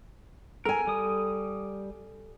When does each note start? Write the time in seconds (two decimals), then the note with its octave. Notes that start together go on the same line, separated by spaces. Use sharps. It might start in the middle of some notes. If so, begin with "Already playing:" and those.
0.65 A4 A#4 G#5
0.87 G3 D#6